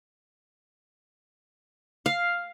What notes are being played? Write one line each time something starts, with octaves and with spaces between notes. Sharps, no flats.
F5